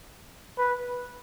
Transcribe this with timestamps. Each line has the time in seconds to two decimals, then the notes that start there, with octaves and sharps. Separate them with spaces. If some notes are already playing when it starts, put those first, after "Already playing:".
0.58 B4